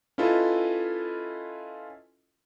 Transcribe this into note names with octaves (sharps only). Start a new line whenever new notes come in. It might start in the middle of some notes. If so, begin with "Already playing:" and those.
C#4 E4 F4 A4 B4 D#5